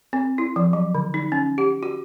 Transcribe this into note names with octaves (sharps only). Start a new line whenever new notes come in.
C4
E4
F3
F#3
D3
D#4
C#4
G4
F#4